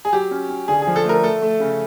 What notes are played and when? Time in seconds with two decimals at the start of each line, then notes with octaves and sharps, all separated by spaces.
0.05 G#4
0.12 F#3 G4
0.31 C#4
0.49 C#4
0.68 D3 G#4
0.82 G#4
0.87 F3
0.96 A4
1.05 A3 A#4
1.23 A3 A4
1.42 A3
1.60 C#3